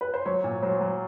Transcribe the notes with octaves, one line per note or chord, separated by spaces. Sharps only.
B4
C5
F#3 C#5
A#2
F#3 C5
F#3